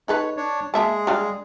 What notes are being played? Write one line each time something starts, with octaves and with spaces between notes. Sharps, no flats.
D#4 A4 B4 C#5
D4 C#5
G#3 A#3 G#4 E5 A5
G3 D4 F5